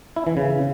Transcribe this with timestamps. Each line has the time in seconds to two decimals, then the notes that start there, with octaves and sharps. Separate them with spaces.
0.16 E4
0.27 E3
0.37 C#3